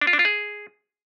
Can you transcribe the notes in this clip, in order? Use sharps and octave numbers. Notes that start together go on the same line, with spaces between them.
D4
F4
D4
F4
G#4